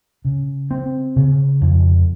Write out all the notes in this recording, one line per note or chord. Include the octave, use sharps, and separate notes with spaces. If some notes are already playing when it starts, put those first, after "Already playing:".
C#3
C4
C#3
F2